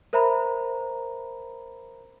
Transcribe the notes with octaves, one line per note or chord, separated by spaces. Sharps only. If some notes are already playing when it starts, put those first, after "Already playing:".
A#4 C5 E5 A#5 B5